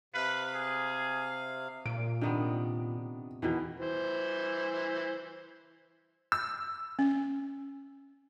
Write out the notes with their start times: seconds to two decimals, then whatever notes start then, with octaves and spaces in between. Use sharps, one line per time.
0.14 C3 B4 F5
0.54 G#4
1.86 A#2 D7
2.21 C3 D#3 B3 D4
3.42 E2 B2 D#3 E3
3.80 E3 C5
6.32 E6
6.99 C#4